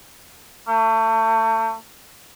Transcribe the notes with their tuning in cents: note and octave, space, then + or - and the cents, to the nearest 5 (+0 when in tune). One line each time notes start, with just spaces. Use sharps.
A3 +30